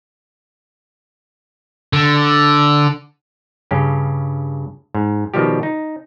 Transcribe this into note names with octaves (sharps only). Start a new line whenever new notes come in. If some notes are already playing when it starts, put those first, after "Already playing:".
D3
G2 C#3 C#4 G4
G#2
B2 D#3 F3 G3 G4
D#4